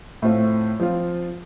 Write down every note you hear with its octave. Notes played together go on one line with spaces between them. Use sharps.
A2 A3 C4 F4
F3 C4 F4